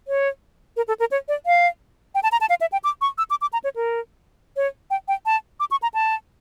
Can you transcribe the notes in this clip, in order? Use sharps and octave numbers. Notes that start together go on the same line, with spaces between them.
C#5
A#4
A4
A#4
C#5
D5
F5
G5
A5
A#5
A5
F5
E5
G5
D6
C#6
E6
D6
D6
A#5
C#5
A#4
C#5
G5
G5
A5
D6
C#6
A#5
A5